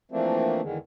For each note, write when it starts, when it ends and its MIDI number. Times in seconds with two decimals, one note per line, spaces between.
0.12 0.61 52
0.12 0.61 53
0.12 0.61 57
0.12 0.61 58
0.12 0.61 60
0.12 0.61 62
0.62 0.78 40
0.62 0.78 50
0.62 0.78 51
0.62 0.78 56